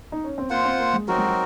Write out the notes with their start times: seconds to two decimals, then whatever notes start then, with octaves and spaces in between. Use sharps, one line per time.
0.12 D#4
0.24 C#4
0.38 C4
0.50 A#3 F4 C5 F#5
0.65 C4
0.79 A#3
0.93 G#3
1.08 F#3 C4 D#4 F#4 A#4
1.18 G#3
1.28 F#3